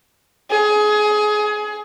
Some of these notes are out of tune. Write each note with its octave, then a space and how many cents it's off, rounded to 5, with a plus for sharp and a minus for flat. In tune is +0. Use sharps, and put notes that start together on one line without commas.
G#4 +25